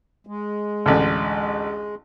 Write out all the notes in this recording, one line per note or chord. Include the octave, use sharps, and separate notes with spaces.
G#3
A1 D2